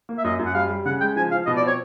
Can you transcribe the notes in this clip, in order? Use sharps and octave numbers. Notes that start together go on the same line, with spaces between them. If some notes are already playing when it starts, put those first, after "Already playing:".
A#3
E5
F#2 D#5
F#2
F#5
G3 F5
G3
C#3 F#5
G#3 G5
F3 G#5
F3 F5
B2 D#5
D5
C4 C#5